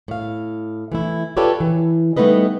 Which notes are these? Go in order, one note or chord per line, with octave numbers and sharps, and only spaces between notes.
A2 F5
E3 A3 E4
F4 G4 A4 B4 C#5 D5
E3
G3 A3 B3 D#4 B4 D#5